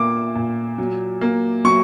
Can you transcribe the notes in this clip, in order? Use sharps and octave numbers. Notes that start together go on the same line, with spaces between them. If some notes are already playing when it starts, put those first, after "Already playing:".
Already playing: A#2 A#3 D6
A#2
F#3
A#3
F#3 C#6